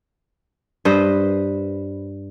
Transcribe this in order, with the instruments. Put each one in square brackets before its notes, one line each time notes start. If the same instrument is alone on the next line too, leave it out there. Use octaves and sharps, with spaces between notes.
[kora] G2 B4 C5 D#5